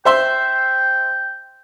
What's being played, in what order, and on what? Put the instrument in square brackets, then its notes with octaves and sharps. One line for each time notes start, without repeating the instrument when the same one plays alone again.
[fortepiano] C5 E5 C6 [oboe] G5